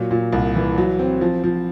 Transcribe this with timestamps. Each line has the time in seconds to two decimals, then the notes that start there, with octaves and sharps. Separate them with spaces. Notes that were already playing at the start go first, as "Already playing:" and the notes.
Already playing: A#2 F#3
0.11 A#2
0.32 C2
0.56 E3
0.78 F#3
0.99 C4
1.21 F3
1.43 F3